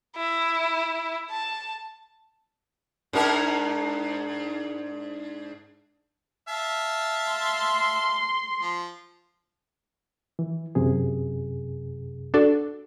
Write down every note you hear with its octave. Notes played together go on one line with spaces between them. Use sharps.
E4
A5
G#2 D4 A#4
E5 F5 A5
C6
F3
E3
F#2 C3 G#4
D4 F#4 A4